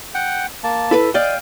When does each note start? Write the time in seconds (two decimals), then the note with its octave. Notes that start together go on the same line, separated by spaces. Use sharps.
0.14 F#5 G5
0.64 A#3 A5
0.91 E4 A4 B4
1.14 D5 D#5 F5 G5